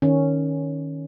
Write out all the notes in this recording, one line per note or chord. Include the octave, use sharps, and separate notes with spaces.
D#3 C#4